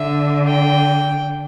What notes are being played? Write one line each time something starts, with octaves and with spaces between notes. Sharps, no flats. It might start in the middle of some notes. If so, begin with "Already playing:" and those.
Already playing: D3 E5
G5